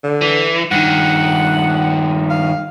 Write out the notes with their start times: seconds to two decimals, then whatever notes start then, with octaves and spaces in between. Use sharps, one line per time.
0.04 D3
0.22 E3
0.71 G2 D#3 F#5
2.30 F5